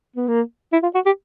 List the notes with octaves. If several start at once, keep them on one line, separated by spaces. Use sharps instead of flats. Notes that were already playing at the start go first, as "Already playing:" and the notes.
B3
A#3
E4
F4
F#4
G4